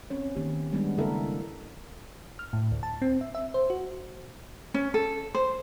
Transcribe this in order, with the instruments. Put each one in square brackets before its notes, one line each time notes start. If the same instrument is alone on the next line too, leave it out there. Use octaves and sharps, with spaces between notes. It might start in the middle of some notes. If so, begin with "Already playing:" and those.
[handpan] C4 C#4 C#5
D#3 A#3 B3 G4
G3 G#3 A#3 B3 D4
C#3 A#3 E4 A4 A#4 E5
[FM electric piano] F6
A2
D2
A5
C4
E5
E5
C5
F#4
[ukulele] C#4
A4
C5